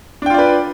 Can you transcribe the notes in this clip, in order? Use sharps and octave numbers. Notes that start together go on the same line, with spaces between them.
D4 F4 B4 D5 G5